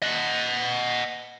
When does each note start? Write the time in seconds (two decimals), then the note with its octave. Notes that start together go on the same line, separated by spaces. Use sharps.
0.02 D#5 F#5